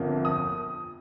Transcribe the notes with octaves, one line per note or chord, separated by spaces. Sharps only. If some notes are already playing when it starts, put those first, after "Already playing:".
Already playing: G1 F2 D3 F3 A#3
D#6